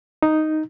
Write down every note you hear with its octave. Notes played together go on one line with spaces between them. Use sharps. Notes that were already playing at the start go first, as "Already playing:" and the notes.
D#4